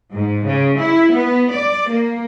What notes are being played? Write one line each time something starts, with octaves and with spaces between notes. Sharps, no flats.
G#2
C#3
E4
B3
D5
A#3